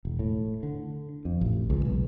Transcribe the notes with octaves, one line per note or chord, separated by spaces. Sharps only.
E1
A2
D3
F2
A1
C#2
B1